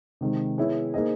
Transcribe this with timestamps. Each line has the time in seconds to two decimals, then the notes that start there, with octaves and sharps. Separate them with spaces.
0.21 C3 D#3 G#3
0.58 B3 E4 G#4 C#5
0.94 A#3 D#4 G#4 C5 D#5